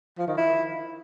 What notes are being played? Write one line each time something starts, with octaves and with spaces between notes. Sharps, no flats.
F3
D#3
E4